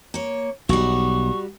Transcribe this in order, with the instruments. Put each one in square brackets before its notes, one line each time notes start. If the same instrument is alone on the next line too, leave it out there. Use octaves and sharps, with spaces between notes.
[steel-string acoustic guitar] A#3 C#5
[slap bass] B1 [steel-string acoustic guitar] G3 F#4 [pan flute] C#6